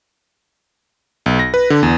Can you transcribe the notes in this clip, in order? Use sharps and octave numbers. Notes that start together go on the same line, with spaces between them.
B1
A#6
B4
D3
E2